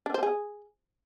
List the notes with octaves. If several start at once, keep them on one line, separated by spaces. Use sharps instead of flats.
D4
C5
G#4